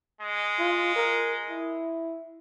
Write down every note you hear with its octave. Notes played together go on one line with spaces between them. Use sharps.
G#3
F4
A#4
E4